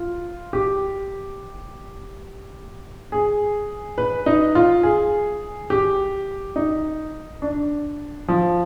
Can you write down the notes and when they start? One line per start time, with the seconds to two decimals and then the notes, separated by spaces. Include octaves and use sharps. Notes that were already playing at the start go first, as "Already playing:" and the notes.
Already playing: F4
0.53 G4
3.12 G#4
3.98 B4
4.26 D#4
4.55 F4
4.83 G#4
5.70 G4
6.56 D#4
7.42 D4
8.28 F3